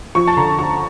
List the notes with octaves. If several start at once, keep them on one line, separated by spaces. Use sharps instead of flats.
F3 C#6
A5
D3 A#5
D2 C#6